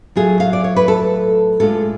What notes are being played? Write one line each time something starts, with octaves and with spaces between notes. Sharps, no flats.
A2 F#3 A3 F4 G#4
F5
D5
C#5
B4
A4
A2 G#3 D4 F4 A4